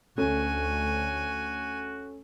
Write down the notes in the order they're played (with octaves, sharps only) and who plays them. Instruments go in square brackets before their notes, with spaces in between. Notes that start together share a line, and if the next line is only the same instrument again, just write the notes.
[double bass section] D2 [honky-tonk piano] A3 C#4 [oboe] F#4 [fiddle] G#5